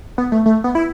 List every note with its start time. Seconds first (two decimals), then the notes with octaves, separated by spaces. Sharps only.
0.18 B3
0.32 A3
0.46 A3
0.64 B3
0.75 E4